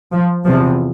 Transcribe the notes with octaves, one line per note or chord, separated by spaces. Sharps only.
F3
E2 C3 F3